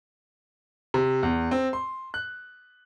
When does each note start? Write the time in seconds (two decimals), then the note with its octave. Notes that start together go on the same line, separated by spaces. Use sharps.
0.94 C3
1.23 E2
1.51 C4
1.73 C6
2.14 F#6